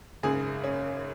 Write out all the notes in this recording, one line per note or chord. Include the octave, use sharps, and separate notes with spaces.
G#1 F#2 C#3 G#4
C#4